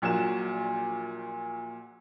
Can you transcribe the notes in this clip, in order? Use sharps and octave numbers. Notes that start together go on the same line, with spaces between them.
A#1 A#2 F#3 E7